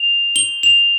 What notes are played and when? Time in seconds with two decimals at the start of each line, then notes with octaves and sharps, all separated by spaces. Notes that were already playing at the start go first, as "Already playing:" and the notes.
Already playing: F7
0.36 G7
0.63 F7